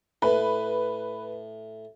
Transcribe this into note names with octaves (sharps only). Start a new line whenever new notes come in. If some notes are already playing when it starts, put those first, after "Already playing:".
A2 B4